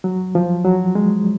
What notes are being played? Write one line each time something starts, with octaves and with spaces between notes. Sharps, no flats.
F#3
F3
F#3
G#3